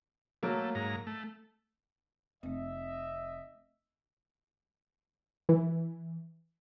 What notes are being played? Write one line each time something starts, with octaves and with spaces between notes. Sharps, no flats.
F#3 A3 A#3
G#2 A#5
A3
F1 A3 C4 D#5 E5
E3